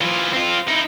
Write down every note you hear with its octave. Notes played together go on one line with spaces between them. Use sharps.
E3 F4
C4 F4
D#4 E4